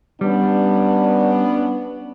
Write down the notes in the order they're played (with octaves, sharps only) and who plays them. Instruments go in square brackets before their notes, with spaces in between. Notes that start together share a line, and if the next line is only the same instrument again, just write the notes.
[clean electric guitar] G3 [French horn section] B3 C#4 D4